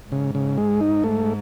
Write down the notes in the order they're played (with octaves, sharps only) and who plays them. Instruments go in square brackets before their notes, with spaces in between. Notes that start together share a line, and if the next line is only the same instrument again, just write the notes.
[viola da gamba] G#2 [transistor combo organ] C#3
[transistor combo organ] C#3
G#3
D#4
A3